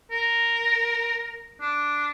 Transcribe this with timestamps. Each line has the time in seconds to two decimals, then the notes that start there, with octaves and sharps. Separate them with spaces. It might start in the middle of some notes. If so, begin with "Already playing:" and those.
0.11 A#4
1.61 D4